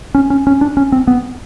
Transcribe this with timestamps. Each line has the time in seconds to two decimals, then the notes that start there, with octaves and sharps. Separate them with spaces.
0.15 C#4
0.30 C#4
0.47 C#4
0.61 D4
0.77 C#4
0.92 C4
1.07 B3